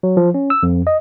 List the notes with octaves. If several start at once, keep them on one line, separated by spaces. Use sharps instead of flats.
F#3
F3
C#4
E6
F2
D#5